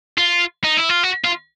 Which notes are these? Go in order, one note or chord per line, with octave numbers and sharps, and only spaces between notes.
F4
D#4
E4
F4
F#4
F4